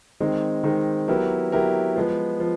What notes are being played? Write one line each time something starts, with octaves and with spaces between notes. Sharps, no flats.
D#3 G#3 C4 D#4
D#3 G#3 C4 D#4
F#3 B3 E4 G4 A#4
F#3 B3 E4 G4 A#4
F3 G#3 B3
F3